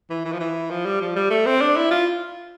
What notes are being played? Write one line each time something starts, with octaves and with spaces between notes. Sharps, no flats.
E3
E3
F3
E3
F3
G3
F3
G3
A3
C4
D4
E4
F4